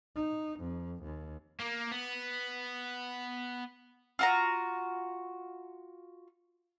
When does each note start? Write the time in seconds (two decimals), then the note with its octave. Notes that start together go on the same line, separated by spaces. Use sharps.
0.16 D#4
0.60 F2
1.03 D#2
1.60 A#3
1.92 B3
4.19 F4 F#4 A#5